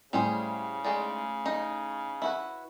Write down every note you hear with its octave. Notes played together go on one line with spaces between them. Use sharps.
A2 C#3 G3 G#4 C5
G#3 D#4 D5
D#4
E4 F#4 B4